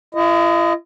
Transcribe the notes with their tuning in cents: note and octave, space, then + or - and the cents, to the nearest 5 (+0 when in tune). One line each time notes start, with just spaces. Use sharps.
E4 +45 D#5 +0